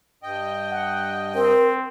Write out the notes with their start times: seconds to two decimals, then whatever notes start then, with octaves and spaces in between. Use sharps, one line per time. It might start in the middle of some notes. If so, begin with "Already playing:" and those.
0.23 G2 D#5 G5
0.71 F#5
1.35 C4 A#4